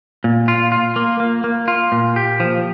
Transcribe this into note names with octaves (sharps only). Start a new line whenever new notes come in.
A#2
F4
F4
A#3
A#3
A#3
F4
A#2
G4
F3